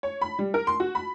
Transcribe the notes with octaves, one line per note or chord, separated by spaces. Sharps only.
C#5
B5
G3
A#4
C6
F#4
B5